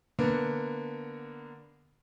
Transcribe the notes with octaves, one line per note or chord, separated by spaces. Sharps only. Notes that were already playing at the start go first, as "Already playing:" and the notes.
D3 A#3 B3